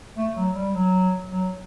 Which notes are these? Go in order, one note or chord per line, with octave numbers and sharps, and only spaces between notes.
A3
F#3
G3
F#3
F#3